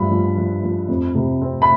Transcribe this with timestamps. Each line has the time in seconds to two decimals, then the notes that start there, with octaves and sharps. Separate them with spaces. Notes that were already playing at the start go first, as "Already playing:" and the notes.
Already playing: G2 F3 B5
0.11 F3
0.37 F3
0.63 F3
0.88 F2
1.15 C3
1.42 C4
1.62 B5